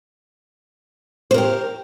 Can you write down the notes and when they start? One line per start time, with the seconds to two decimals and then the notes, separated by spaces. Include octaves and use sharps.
1.31 C5
1.34 A#4
1.38 G4